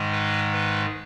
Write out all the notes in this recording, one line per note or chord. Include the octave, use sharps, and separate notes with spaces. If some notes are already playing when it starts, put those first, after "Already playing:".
Already playing: G#2 D#3 G#3
B4
B4